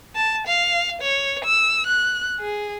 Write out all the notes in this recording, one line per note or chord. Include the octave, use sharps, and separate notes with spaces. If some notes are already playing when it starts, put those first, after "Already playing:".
A5
F5
C#5
E6
F#6
G#4